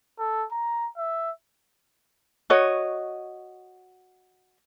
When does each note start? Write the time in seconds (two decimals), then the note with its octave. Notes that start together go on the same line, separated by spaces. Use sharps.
0.19 A4
0.52 A#5
0.97 E5
2.50 F#4 C#5 D#5